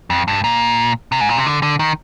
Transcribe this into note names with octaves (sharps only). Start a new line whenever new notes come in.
F2
G2
A#2
C3
G#2
A#2
C3
D3
D3
D#3